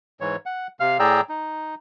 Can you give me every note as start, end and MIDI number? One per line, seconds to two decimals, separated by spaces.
0.21 0.36 44
0.21 0.36 52
0.21 0.36 73
0.46 0.67 78
0.80 0.98 48
0.80 0.98 77
0.80 0.98 89
0.99 1.21 45
0.99 1.21 68
0.99 1.21 74
0.99 1.21 79
0.99 1.21 82
0.99 1.21 88
1.29 1.75 63